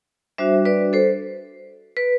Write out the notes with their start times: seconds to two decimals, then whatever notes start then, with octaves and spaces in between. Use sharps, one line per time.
0.38 G3 D4 F#4 C5 E5
0.65 B4 D5
0.93 A4 C5
1.97 B4